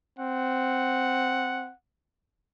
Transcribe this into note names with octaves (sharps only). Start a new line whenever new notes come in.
C4 F#5